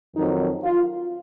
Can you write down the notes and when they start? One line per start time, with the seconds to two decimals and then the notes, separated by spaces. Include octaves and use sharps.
0.15 F2 D#3 F#3 D#4
0.64 F4